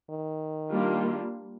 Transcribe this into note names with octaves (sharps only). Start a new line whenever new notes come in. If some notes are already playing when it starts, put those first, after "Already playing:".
D#3
G3 A#3 D4 F4